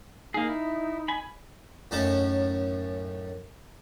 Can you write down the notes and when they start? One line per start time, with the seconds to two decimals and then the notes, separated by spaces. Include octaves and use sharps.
0.34 A#3 D#4 G#4
0.49 E4
1.08 G#5 B5
1.91 F#2 A2 C#4 D#4 A5